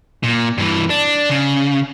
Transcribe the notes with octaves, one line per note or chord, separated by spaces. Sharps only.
A#2
G2 E3
D4
C#3